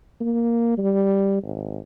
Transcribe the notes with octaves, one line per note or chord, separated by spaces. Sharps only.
A#3
G3
G#1